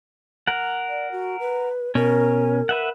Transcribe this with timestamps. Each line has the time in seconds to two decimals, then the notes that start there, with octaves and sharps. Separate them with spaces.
0.47 A#4 F#5
0.89 D5
1.12 F#4
1.40 B4
1.95 B2 C#4 A#4
2.69 B4 E5 F#5